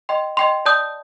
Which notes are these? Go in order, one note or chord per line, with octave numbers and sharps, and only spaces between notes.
D#5 G5 C6
D#5 G5 C6
D5 A5 D#6 G6